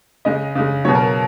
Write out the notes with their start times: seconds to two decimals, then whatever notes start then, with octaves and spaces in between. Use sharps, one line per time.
0.25 C#3 G#3 D#5
0.55 C#3 G#3
0.85 B2 F#3 C#5
0.95 A#4